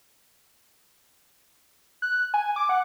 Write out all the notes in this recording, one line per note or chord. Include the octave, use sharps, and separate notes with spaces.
F#6
G#5
D6
F#5